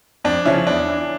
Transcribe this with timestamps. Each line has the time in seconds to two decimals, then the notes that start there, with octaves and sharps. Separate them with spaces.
0.24 F2 D4
0.45 C#3 F3 C#4 E4
0.67 E2 D4
0.88 E3